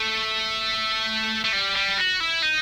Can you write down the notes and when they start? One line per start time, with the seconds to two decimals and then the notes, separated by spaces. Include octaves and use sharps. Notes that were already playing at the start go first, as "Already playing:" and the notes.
Already playing: A3
1.45 A3
1.53 G3
1.76 G3
1.98 F#4
2.20 E4
2.42 D#4